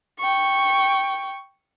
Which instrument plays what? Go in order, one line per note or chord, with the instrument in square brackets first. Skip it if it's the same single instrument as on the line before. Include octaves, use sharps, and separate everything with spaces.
[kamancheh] G5 C#6